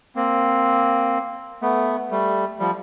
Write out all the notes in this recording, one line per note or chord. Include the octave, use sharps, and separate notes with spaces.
A#3 C4
A3 B3
G3 A3
F3 G3